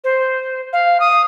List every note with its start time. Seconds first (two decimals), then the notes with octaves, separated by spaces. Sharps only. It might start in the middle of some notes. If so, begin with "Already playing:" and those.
0.04 C5
0.73 F5
1.00 D#6